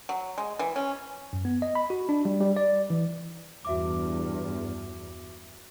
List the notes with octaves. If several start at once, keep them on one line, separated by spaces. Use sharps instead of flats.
F#3
G#3
E3
C#4
F#2
B3
D#5
B5
F#4
D4
G3
G3
D5
E3
E2 G2 F#4 E5 D6